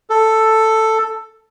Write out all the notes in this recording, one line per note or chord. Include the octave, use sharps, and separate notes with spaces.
A4